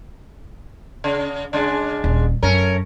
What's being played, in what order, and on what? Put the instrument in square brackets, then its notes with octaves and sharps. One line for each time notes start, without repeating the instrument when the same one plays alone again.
[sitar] C#3
C#3 G#3 D4
[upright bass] D#1
[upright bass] F#2 [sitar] A3 C#4 A#4